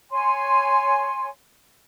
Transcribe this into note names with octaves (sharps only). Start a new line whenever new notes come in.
C#5 G#5 C6